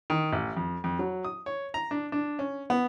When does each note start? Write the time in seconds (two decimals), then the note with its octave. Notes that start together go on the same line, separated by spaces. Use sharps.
0.10 D#3
0.33 A1
0.57 F2
0.84 F2
0.99 F#3
1.24 D#6
1.46 C#5
1.74 A#5
1.91 D4
2.12 D4
2.39 C#4
2.70 B3